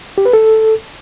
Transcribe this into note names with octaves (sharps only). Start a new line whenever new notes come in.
G4
B4
A4